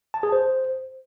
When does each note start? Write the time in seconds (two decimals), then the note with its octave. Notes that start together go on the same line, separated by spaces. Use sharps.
0.14 A5
0.23 G#4
0.32 C5